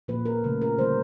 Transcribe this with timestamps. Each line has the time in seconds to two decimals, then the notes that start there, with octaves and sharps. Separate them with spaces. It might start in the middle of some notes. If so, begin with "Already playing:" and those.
0.08 A#2 F3 A#3 B4
0.26 A#4
0.44 C#3 F3 A3
0.62 A#4
0.78 D3 G3 A#3 C5